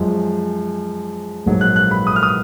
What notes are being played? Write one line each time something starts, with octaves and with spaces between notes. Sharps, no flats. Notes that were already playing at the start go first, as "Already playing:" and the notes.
Already playing: F#2 F3 G#3
A#1 G#2 F#3 A#3
F#6
F#6
B5
D#6
F6
D#6